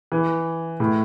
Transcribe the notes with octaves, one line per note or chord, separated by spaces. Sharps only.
E3
A2